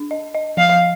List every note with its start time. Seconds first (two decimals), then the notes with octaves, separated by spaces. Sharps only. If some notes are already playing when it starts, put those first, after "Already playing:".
Already playing: D4
0.11 D#5
0.35 D#5
0.57 F3 F5